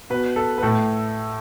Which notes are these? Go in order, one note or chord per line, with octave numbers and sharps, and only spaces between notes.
B2 B4
A4
B4
A2 A4